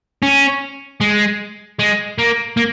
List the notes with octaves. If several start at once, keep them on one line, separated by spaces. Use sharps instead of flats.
C#4
G#3
G#3
A#3
A#3